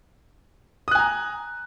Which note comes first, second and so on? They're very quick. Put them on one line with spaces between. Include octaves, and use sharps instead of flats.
D#6 F#6 G#5 A#5